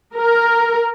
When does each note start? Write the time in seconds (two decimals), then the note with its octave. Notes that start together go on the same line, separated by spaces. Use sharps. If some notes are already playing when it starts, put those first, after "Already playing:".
0.14 A#4